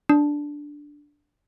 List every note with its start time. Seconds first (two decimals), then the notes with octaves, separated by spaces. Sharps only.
0.09 D4